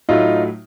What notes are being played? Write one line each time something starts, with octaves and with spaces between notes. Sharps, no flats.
A2 F#3 A3 D#4 F4